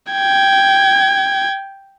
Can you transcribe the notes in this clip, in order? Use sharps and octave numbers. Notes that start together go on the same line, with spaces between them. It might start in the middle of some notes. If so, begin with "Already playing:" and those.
G5 G#6